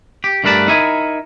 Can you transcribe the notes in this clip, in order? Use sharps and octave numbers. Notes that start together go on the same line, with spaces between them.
G4
G2 A3 A#4 B4 D5 A5
D#4 E4 A#4 E5 G#5